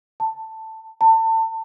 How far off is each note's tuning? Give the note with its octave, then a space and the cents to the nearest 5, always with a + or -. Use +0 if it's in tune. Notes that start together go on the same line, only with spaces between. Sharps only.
A5 +10
A5 +30